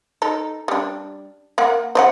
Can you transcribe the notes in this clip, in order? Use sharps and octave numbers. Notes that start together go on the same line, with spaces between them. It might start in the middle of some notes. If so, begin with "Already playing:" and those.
D#4 A4
G3 D4
A#3 F#5
C5 D5 F#5